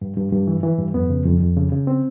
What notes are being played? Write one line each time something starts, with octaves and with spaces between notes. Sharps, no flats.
G2
G2
G2
E3
E3
G2
F2 B3
C#3
F2
F2
C#3
C#3
C4